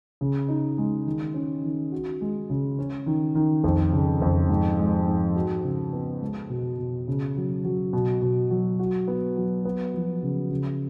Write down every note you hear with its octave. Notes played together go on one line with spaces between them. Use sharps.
C#3
D#4
G#3
D#3
C#4
D#3
F#4
G#3
C#3
C#4
D#3
D#3
F2
C#3
F2
G#2
G#3
G#2
F#4
C#3
B3
G#3
B2
B2
C#3
F#3
F#3
B2
B2
F#3
F#4
B3
F#3
B3
F3
C#3
C#3